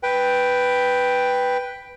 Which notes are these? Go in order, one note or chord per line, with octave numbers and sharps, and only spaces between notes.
B4 G5